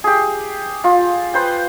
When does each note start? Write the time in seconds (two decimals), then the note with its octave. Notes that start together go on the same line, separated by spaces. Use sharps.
0.04 G4 G#4
0.84 F4
1.34 B4 C5 G5